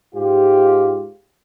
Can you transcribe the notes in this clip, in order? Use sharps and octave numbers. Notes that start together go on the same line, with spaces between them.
G#2 F4 G4